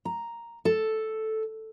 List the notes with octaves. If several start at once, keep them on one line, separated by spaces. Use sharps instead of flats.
A#5
A4